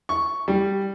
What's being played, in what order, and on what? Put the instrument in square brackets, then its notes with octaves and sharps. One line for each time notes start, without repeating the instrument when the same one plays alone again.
[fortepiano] C#6
G3